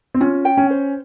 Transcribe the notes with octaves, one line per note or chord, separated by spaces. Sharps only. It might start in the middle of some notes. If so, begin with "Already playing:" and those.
C4
C#4 F4
G5
C#4
C5